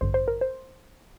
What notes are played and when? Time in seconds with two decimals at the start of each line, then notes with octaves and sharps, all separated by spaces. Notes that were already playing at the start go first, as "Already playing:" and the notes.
0.01 A1 G2 D3 C5
0.14 C5
0.28 A#4
0.41 C5